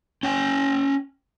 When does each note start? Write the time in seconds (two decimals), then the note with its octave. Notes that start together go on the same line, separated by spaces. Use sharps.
0.23 C#4 G5 G#5